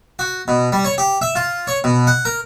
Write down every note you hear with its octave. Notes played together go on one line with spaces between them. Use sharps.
F#4
B2
G3
C#5
G4
E5
F4
C#5
B2
F#5
A#4